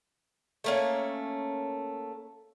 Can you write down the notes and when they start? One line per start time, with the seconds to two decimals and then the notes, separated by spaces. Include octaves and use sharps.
0.64 A3 A#3 C#4